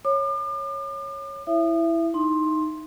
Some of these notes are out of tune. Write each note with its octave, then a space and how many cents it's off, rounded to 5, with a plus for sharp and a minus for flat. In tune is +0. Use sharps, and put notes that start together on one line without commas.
C#5 -10 D6 +40
E4 +0 E5 +25 D#6 -35
D#4 +0 C6 +10